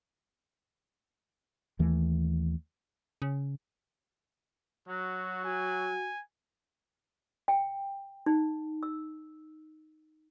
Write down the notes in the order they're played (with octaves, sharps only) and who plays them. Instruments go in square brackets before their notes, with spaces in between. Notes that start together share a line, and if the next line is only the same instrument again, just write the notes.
[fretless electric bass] D#2 E3 A3
[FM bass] C#3
[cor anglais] F#3 [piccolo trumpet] F#4
[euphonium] F#4 [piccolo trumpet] G#5
[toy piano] G5
D#4
E6